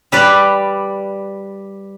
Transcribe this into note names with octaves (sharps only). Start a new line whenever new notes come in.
G3 B4 D5